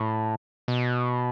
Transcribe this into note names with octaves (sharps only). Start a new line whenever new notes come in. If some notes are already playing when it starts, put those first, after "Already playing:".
Already playing: A2
B2